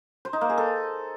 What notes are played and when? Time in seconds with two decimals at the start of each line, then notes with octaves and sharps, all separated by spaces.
0.25 C5
0.33 D#4
0.41 A#3
0.49 G#4
0.58 A4